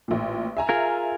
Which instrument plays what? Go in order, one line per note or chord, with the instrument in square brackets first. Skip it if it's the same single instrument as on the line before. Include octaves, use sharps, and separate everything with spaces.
[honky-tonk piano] A1 A#2
E5 G#5 A#5
[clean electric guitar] F4 G#4 A#4